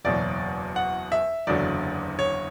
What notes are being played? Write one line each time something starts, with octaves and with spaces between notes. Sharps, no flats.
F#1 E2 B2 F#3 D5
F#5
E5
F#1 E2 D3 F#3 D5
C#5